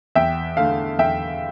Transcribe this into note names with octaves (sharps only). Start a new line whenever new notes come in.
E2 E5 G5
D3 A3 F5
E2 E5 G5